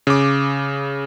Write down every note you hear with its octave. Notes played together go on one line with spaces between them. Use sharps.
C#3 D6